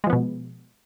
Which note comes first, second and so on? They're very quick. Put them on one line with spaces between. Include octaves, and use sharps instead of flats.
G#3 F3 B3 B2